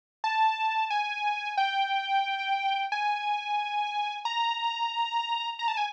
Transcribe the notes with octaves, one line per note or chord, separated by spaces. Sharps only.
A5
G#5
G5
G#5
A#5
A#5
A5
G#5